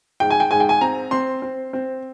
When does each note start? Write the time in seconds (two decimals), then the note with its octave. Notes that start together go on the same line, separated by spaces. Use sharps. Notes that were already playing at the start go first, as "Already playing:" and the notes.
0.20 G#2 G5
0.31 G#5
0.40 G5
0.51 G#2 G#5
0.60 G5
0.69 G#5
0.81 C4 A#5
1.11 C4 C6
1.42 C4
1.73 C4